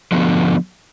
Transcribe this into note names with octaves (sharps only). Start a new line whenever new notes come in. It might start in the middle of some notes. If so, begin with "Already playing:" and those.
D3 F3 B3